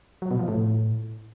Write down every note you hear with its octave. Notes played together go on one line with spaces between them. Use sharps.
F#3
B2
F3
A2